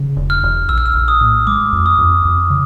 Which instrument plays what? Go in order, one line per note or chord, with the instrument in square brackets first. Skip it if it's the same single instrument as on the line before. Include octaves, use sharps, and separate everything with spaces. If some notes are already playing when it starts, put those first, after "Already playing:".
Already playing: [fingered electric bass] C#3
E1
[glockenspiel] F6
[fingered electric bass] E1
[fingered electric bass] A#1 [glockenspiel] E6
[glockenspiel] F6
E6
[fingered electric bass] A#1
[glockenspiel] D#6
[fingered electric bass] A2
[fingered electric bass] G#3 [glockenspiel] D6
[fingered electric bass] F2
[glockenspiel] D#6
[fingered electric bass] F2
F2
C#3